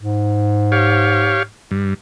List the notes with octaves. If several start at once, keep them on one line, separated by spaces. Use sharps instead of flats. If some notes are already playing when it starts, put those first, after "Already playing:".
G#2
G4 C#5 F5
G2